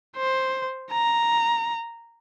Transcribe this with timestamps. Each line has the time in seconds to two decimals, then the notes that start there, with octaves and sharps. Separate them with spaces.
0.16 C5
0.92 A#5